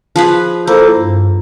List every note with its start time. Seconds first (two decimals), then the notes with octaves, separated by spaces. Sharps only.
0.16 F3 G#4 B4
0.67 A#3 E4 A4 C5
0.98 G2